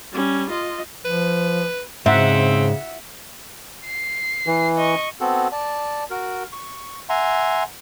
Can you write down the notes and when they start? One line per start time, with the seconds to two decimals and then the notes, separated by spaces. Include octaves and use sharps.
0.13 G3 C#4
0.51 F4 D#5
1.05 F3 B4
2.06 G#2 C#3 C4 E5 F#5
3.86 C7
4.47 E3
4.77 D#5 C#6
5.20 B3 C4 F#4 A4
5.52 D5 A5
6.10 F#4 A#4
6.53 C#6
7.09 E5 F#5 G#5 A#5 C6